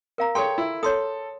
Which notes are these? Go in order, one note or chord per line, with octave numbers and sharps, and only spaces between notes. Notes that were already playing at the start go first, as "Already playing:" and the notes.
A#4 F5 A#5
G#4 A4 C#5 G5 C6
E4
A4 C#5 C6 D#6